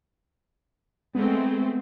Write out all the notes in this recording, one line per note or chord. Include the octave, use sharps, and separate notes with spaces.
G#3 A3 B3 C4